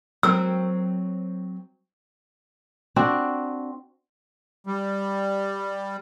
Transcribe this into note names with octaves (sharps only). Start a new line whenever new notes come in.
F#3 C4 A#4 E6
C4 D4 F#4
G3